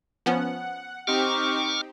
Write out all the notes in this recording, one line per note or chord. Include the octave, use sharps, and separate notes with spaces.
F3 B3 C#4 F#5
C4 D#4 G4 C#6 D6 F6